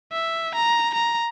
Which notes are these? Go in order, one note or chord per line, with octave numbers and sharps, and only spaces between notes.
E5
A#5
A#5